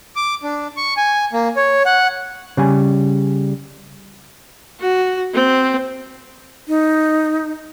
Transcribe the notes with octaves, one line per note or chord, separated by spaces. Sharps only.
D6
D4
C#6
G#5
A#3
C#5
F#5
C#3 G3 G#5
F#4
C4
D#4